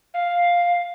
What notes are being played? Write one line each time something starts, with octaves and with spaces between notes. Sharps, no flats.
F5